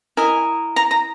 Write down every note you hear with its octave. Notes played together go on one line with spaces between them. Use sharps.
E4 A#4 D#5 G#5
A#5
A#5